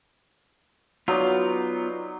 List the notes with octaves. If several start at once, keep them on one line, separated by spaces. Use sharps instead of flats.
F#3 B3 D#4 F4 D5